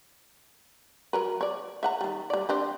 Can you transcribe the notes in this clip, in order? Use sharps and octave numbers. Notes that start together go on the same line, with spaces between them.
F#3 A#4 B4
C#5 D5
E5 F#5 A#5
D#3 G3
G3 D5
C4 D4 G4